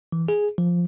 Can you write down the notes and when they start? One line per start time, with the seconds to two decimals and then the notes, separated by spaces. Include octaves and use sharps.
0.12 E3
0.28 G#4
0.58 F3